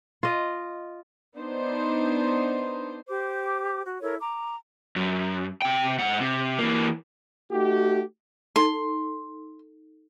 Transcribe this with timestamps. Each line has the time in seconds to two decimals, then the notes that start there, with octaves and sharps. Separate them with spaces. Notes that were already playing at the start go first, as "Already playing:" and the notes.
0.23 F4 D#5
1.36 B3 D4 D#4 C5
3.07 G4 C5 D6
3.85 F#4
4.02 E4 A4 A#4 C#5
4.21 A#5 D6
4.96 F#2
5.62 C3 G5
5.99 G#2 F#5
6.21 C3
6.59 E3 A#3
7.52 A3 D#4 F#4 G4
8.56 D#4 A4 C6